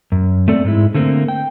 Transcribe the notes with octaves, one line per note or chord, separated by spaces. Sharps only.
F#2
A3 C4 A4 D5
G#2 G#3 E4
D3 A3 A#3 C4
G5